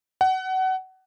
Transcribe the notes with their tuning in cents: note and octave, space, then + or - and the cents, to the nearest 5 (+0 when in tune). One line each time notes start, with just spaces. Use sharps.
F#5 +25